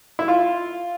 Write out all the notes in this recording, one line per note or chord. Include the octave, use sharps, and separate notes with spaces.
E4
F4